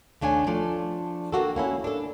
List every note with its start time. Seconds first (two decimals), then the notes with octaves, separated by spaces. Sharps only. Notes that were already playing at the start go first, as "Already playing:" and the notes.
0.21 D#2 A3 D4 C#5 G#5
0.47 F3 A3 D4 D5
1.32 A#3 D4 F#4 G4 A4
1.56 A#3 C#4 E4
1.84 D4 A4